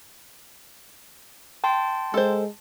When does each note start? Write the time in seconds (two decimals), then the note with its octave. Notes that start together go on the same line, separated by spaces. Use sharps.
1.64 G5 A5 C6
2.14 G#3 A4 C5